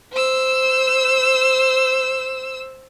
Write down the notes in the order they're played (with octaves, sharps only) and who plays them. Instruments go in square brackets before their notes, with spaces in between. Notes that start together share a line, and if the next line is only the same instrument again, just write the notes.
[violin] C5 E6